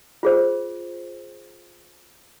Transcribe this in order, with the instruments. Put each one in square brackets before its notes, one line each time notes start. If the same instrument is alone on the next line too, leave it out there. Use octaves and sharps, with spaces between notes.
[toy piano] F4 G#4 C5